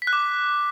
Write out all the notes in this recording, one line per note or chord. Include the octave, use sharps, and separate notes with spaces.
B6
F#6
D6